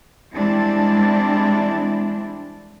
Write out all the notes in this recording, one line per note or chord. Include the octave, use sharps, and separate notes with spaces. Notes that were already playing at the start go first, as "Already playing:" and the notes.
E3 G3 G#3 C4 D4 E4